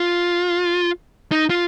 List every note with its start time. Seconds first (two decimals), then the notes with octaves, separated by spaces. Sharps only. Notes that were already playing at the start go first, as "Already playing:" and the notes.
Already playing: F4
1.32 D#4
1.50 F4